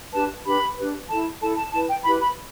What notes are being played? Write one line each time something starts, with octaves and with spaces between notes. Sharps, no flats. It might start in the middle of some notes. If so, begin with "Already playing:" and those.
D4 G4 B4 A5
D4 G4 B4 B5
D4 G4 B4
E4 A4 A5
E4 A4 A5
A5
E4 B4 A5
G5
E4 G4 B4 B5
B5